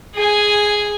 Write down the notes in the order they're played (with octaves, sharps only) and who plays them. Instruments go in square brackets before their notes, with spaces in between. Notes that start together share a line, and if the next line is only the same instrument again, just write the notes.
[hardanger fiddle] G#4 G#5